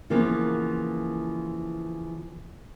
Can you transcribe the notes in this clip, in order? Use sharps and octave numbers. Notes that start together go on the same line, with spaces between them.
C#3 E3 F3 A#3 B3